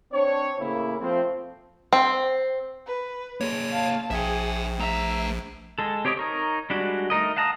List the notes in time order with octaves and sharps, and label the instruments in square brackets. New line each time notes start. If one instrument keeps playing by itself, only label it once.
[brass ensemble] C4 D4 C#5
A2 C#3 A#3 E4
F3 A3 C4
[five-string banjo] C4
[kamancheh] B4
[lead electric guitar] A#3 G#4 [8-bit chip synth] C#5
[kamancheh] F5 A5
[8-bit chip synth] A#1 [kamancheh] G#4 [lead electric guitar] E5 G5
[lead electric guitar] A3 A#5 [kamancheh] E5
[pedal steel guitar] G#3 A4
C4 G4 C#5 D#5 D6
D#4 A#4 C#5
G3 G#3 D4 F#4
A3 D#4 A#4 D#5
F5 F#5 A5 A#5 D#6